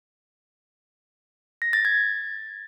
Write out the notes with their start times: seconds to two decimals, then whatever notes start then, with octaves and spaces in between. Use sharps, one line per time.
1.62 A#6
1.73 A6
1.85 G#6